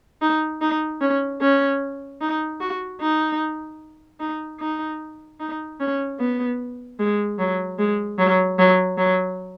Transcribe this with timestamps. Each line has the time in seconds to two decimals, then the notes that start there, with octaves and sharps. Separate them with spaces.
0.22 D#4
0.61 D#4
1.01 C#4
1.41 C#4
2.21 D#4
2.61 F#4
3.01 D#4
4.20 D#4
4.60 D#4
5.40 D#4
5.80 C#4
6.20 B3
6.99 G#3
7.39 F#3
7.79 G#3
8.19 F#3
8.59 F#3
8.98 F#3